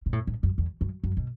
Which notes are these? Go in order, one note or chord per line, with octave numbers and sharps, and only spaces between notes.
B2
A2
A2
F#2
E2
F#2
F#2
B2